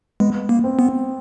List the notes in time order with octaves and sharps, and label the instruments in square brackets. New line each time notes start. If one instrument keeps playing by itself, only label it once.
[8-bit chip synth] G#3 [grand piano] B3
[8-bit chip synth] A#3
[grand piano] C4
[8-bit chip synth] B3